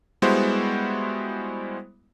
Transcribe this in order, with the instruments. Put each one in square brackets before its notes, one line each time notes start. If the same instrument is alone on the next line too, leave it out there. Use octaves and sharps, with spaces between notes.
[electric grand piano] G3 G#3 B3 E4 F#4 C5